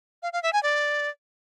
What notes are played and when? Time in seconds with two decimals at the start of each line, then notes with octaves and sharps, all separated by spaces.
0.23 F5
0.33 F5
0.43 E5
0.53 G#5
0.63 D5